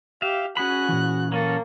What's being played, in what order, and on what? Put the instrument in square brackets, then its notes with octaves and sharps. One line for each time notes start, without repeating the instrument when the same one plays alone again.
[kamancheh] G4 [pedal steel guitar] E5 F5
[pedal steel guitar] C#4 G#4 B5 [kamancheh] F#4 F#6
[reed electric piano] A#2 E3
[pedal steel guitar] F#3 C#4 A4 [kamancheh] A#3